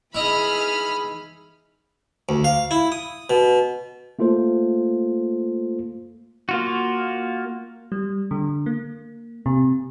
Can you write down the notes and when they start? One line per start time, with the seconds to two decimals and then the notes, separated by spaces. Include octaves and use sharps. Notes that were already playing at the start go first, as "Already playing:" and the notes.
0.14 E3 D#4 E4 G#4 D#5 B5 F6
2.29 D2
2.44 F5
2.71 E4
2.92 D#6
3.30 B2
4.19 A3 A#3 F4 A4 C5
6.49 A#3 F4 F#4
7.92 G3
8.31 D3
8.66 A#3
9.46 C3